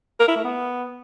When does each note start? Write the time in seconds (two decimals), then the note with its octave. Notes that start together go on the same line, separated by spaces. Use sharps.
0.20 A#4
0.28 E4
0.36 A3
0.44 B3